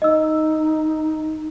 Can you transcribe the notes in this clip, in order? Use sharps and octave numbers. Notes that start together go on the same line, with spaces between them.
D#4 D#5 E6